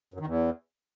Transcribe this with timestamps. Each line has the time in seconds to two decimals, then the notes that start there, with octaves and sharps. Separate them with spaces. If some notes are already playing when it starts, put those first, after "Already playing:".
0.14 F#2
0.20 D#3
0.26 E2